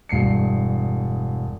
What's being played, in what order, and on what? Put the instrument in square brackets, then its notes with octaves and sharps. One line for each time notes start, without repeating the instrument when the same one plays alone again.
[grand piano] E1 G2 C7 C#7